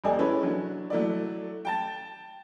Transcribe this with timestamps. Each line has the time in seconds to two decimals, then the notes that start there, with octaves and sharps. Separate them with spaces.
0.04 D#1 D#2 A4 D5 D#5 G#5
0.19 G#3 C#4 E4 A4 B4 C#5
0.43 F#3 D4
0.90 F#3 A3 E4 D5
1.65 G5 A5 A6